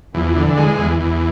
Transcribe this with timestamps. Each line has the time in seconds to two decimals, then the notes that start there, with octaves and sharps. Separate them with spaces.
0.14 E2 F3
0.36 D3
0.46 E3
0.57 G#3
0.78 E2
1.00 E2